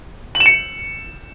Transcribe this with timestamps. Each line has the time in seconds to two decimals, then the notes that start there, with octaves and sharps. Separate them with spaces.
0.35 F#7
0.40 E7
0.46 C#7